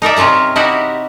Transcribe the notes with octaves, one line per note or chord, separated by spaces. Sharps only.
D#4 A#4 D5 E5
C3 C#4 F4 A#4 A#5
D#4 E4 F#4 G4